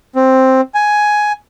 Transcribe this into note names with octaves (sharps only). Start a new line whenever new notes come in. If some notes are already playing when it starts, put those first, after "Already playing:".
C4
G#5